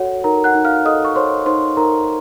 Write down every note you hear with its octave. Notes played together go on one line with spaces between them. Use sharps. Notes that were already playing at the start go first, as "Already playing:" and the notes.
Already playing: F#4 A4 C#5 F#5
D#4 A#4 A#5
F#5 F#6
D#4
F5 F6
A4 D#5 D#6
C#6
C5 C#5 C6
D#4 C5 C6
D#4 A#4 A#5